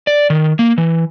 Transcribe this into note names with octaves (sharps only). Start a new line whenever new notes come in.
D5
D#3
A#3
E3